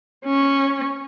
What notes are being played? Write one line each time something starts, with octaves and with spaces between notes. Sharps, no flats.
C#4